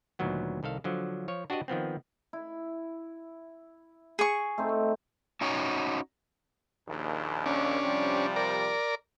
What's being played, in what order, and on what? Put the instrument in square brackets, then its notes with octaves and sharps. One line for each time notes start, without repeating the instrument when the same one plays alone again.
[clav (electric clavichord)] D2 A#2 D#3 F#3 B3
C2 D#3 A4 F5
D3 F3 F#3
F3 C#5
D4 F#4 G4 C5 D5 D#5
D#3 F3 B3 C4
[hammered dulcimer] E4
[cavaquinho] G#4 C#6
[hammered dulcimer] A3 C4 D#4
[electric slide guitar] C#4 D#4 F#4 C#5
[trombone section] A#1 D#2
[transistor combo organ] C#4 D4
[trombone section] C3 F3 G3
[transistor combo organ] A#4 D5